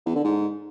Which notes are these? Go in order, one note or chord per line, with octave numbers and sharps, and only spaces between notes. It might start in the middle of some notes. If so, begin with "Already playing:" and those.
E2
D3
G#2